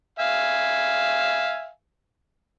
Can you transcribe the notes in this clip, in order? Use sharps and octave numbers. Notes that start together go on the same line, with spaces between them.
E5 F5 G#5